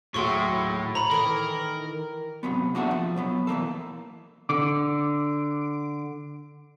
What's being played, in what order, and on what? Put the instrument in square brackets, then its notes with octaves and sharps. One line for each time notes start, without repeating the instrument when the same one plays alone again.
[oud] D#2 F#3 G#4 [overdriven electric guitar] A2 A3 [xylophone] G5 C6 C#6
[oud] C#5 [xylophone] A#5 B5
[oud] D#3 E3 [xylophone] A4 [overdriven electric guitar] A#4
[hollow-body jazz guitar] G#2 C3 F#3 B3
A#3 D4 F#4 G#4 A4 E5
F3
B1 F#3 B3
B1 E3 A#3 A4
[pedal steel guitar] D3 D6